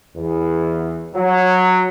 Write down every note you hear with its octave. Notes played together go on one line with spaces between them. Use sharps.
E2
F#3